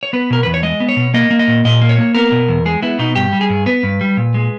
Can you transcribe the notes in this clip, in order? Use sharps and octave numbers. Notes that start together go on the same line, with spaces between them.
C#5
B3 B4
B2 A#4
E2 B4
C#5
G#3 D#5
B3
C#5
B2
A#3 D#5
A#3
D#5
A#2
A#2 D#5
A#3
C#5
A#3
B3 A#4
B2
E2
G#3 G#4
B3 E4
B2 D#4
G2 G4
G3
G#4
G2
B3 B4
G2
G3
A#2
G#3